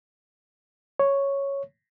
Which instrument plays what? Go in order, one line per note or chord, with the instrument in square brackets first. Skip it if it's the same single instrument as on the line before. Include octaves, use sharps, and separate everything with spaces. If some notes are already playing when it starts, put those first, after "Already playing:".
[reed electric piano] C#5